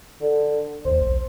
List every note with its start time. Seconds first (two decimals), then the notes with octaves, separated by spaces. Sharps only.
0.21 D3
0.85 D#2 C5
1.00 B1